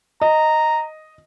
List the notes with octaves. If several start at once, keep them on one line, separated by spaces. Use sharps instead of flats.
D#5 A#5